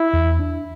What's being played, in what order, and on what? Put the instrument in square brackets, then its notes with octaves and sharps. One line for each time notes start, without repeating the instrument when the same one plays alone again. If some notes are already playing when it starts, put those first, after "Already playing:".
Already playing: [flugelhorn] E4
[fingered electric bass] E2
D4